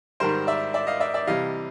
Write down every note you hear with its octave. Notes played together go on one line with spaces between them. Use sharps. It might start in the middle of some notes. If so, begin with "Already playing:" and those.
G#2 D#3 G3 A#4 C5
D5 E5
D5 E5
D#5 F5
D5 E5
D5 E5
C3 E3 G3 D#5 F5